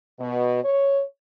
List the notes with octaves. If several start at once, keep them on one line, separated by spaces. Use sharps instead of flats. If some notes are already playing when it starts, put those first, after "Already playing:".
B2
C#5